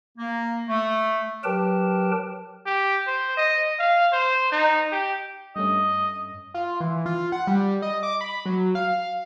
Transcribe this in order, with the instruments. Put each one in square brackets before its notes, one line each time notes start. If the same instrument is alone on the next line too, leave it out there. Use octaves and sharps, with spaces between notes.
[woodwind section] A#3
A3
[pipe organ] F#3 G4 A#4 B4 G5 A5
[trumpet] G4
C5
D#5
F5
C5
D#4
G4
[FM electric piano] G2 A3 C#4 [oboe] D#5
[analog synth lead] F4
E3
F4
F#5
G3
D#5
D6
B5
F#3
F5